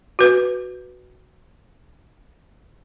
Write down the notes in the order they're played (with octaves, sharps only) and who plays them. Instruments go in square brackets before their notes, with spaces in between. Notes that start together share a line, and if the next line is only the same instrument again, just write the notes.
[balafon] F#4 B4